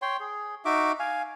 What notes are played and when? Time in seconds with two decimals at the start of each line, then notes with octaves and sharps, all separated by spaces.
0.02 C#5 G5 C6
0.20 G#4
0.65 D#4 F#4 E5 D6
0.99 F5 G#5